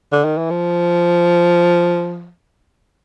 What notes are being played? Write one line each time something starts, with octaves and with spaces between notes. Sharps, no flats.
D3
D#3
E3
F3